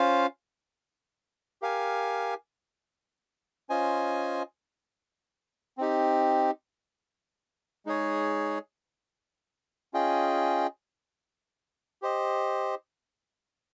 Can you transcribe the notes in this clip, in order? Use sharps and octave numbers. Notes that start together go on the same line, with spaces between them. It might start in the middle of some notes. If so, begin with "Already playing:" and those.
Already playing: C#4 F4 C5 F5
G4 A#4 F5 G#5
C#4 F4 C5 D#5 G#5
C4 D#4 G4
G#3 D#4 G#4 C#5
C#4 F4 G#4 D#5 G5
G4 C5 D#5